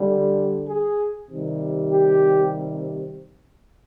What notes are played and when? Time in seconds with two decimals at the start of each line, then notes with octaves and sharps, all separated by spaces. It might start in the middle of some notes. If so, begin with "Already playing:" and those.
Already playing: D3 G3
0.67 G#4
1.29 C3 D#3 G3
1.90 G4